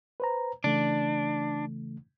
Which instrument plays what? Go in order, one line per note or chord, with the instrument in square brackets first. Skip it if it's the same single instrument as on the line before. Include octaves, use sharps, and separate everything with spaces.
[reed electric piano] B4 C5 A#5
[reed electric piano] C#3 E3 A3 [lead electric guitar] D4